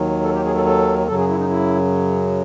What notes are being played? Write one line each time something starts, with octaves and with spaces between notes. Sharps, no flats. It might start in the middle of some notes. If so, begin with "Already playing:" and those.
Already playing: D#2 D#3 F#3
A4
G4
G#4
A4
A4
F#2 C#3 F#3 A4
G#4
E4
D#4
E4